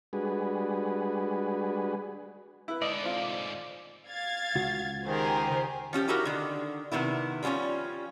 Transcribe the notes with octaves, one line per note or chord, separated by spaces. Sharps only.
G3 G#3 D4 F#4 G#4 B4
E4 B4
G#2 D3 D5 D#5
C4 F4
F5 G#6 A6
C#2 F#4
D#3 G4 G#4 A#4 C5
F3 C#4 F#4 G4
D#4 E4 F#4 G4 A#4
D3 D#3
C3 D#3 B3 E4
F3 G3 B3 C#4 F4